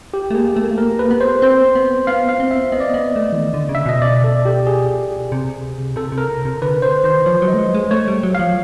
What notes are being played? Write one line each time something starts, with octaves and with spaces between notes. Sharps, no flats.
G4
A3
A#3 G#4
A3 A4
A#3
A3
A#3 A#4
B4
B3
C5
C4 C5
B3
B3 F5
F5
C4
E5
B3 D#5
D5
B3 D#5
A3
E3
D#3
D3
C#3
E5
B2 D#5
D5
A4
G4
G#4
C3
C3 A4
C3
A#4
C3
D3 B4
C5
D#3 C5
F3 C#5
F#3
D#5
A3
G#3
G#3
A3 C#5
G3
F#3
F3 F5